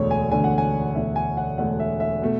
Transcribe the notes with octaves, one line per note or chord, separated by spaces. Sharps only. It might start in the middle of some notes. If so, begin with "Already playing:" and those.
Already playing: E1 D2 D3 A3 D4 C#5
G#5
E1 D2 D3 A3 D4 G#5
F#5
G#5
E1 D2 D3 A3 D4 E5
G#5
F#5
E1 D2 D3 A3 D4 F#5
E5
E5
B2 A3